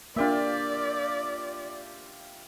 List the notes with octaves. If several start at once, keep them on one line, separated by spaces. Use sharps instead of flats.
A#3 D4 F4 G4 D5 E5